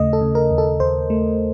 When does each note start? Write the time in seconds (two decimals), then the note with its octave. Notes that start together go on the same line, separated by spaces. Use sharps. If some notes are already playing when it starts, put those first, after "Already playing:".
Already playing: D#2 C#3 A3 D#5
0.13 A4
0.21 C#3
0.35 A#4
0.51 D#2
0.58 A4
0.80 D#2 C5
1.10 A3